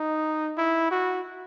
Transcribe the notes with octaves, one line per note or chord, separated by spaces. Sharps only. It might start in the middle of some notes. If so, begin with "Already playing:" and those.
Already playing: D#4
E4
F#4